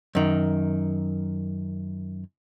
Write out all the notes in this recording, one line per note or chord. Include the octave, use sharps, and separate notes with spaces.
F#2 D#3